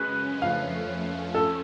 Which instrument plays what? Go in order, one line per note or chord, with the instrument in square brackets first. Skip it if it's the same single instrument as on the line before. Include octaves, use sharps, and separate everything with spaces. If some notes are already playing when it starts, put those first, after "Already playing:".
Already playing: [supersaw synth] F#2 C#3 G#3 C#4 [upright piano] B4
[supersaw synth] F2 F3 A3 C#4 [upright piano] F5
[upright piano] A4